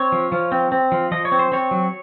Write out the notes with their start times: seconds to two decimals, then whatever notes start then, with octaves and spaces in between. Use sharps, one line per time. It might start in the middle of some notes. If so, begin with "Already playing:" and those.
Already playing: C4 C#5
0.12 F3
0.32 F3
0.52 C4
0.72 C4
0.92 F3
1.12 F3 D#5
1.25 C#5
1.32 C4
1.39 C5
1.52 C4 C#5
1.71 F#3